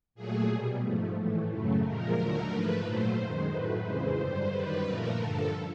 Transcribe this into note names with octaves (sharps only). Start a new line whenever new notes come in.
A#2 F#3 A3 G#4
B2 G3
G#2 F3 A3
A2 E3 A3
F#2 C#3 F#3 A3
A#2 F3 G#3 A#4
D#2 D3 F#3 A3
G#2 F3 A3 B4
A#2 F#3 A3 C5
F#2 D#3 G#3
A2 F#3 A3 B4
F2 C#3 E3 G#3 C5
G2 D3 G3 C5
F#2 D#3 G3 B4
A#2 F3 A3 A#4
G2 D3 F3 A4